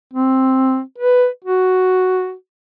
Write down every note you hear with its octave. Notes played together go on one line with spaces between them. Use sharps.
C4
B4
F#4